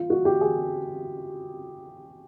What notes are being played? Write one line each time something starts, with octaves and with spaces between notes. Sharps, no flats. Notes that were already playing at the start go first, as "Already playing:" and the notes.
Already playing: F4
F#4
G4
G#4